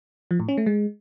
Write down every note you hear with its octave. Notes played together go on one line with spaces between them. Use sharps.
F3
A2
C#4
A3
G#3